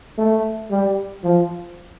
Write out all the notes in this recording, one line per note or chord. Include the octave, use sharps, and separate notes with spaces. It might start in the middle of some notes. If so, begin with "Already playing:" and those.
A3
G3
F3